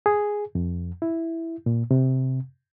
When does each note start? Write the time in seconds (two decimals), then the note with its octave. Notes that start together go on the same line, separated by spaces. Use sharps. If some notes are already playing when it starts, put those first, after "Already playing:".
0.06 G#4
0.55 F2
1.02 E4
1.66 A#2
1.91 C3